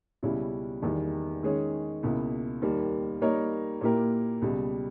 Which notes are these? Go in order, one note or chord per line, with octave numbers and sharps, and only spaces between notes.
C#2 B2 G3 C#4 E4
E2 D#3 G3
D#3 G#3 C#4 G#4 C#5
C#2 B2 A#3 E4
D#2 D#3 G3 A#3
G3 A#3 D#4 A#4 C#5
A#2 A#3 E4 G4 A#4
C#2 B2 G3